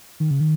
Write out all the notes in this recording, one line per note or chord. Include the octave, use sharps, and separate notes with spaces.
D#3
C#3
D#3